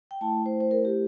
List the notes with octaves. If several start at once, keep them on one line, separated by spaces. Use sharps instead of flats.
G5
A3 E4 A5
C5
C5
A#4
G4